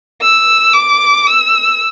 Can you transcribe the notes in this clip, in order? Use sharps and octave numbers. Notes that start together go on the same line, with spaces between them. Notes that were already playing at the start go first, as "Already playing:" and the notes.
E6
D6
E6